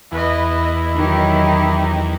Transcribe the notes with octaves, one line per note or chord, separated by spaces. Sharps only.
E2 E4 B4 D#5
D#3 F#3 D#4 G4